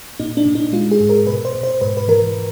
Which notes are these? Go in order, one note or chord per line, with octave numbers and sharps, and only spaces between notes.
A#2 D#4
D4
A#2
D#4
G#3 F4
G#4
G#2
A#4
B2 B4
C5
B2
C5
G#2 B4
B4
E3 A#4